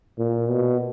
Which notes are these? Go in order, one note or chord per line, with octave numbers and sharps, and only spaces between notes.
A#2
B2